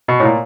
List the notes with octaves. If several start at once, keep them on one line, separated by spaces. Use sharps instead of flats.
B2
A2
A#2